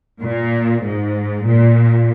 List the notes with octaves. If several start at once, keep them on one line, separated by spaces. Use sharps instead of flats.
A#2
G#2
A#2